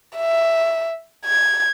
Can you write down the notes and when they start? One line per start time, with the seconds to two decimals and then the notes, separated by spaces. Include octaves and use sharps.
0.17 E5
1.25 G#6